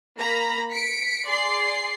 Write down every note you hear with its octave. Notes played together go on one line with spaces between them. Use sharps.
A#3 A#5 B5
B6 C#7 D7
G#4 D5 C6 C7